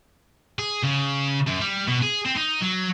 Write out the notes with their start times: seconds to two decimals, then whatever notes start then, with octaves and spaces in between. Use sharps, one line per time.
0.58 G#4
0.84 C#3
1.47 F#2
1.61 G3
1.88 B2
2.03 G#4
2.25 C4
2.36 D#4
2.61 F#3